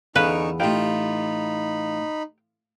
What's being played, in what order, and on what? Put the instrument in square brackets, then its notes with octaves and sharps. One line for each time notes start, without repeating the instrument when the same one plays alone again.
[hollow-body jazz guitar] E2 F5 [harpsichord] D3 C#4 [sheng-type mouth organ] D#4 C#6 [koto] B4
[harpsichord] A1 A2 F4 [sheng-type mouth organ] D#4 B5 [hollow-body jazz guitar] G4 F5 G5